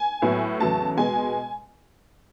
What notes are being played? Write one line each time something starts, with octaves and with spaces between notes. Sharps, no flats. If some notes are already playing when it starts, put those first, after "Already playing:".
Already playing: G#5
A2 F#3 B3
E2 C#3 F#3 A3 A5
B2 G#3 B3 G#5